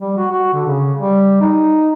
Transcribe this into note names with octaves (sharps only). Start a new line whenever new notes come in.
G3
F#4
F#4
D3
C#3
G3
D#4